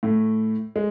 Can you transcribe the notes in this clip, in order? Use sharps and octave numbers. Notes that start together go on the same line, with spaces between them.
A2 A3
G#3